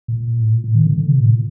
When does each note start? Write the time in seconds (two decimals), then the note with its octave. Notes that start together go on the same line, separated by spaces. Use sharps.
0.08 A#2
0.41 A2
0.52 A#2
0.64 A2
0.75 D#3
0.87 D3
0.98 D3
1.08 C3
1.20 A2
1.31 A#2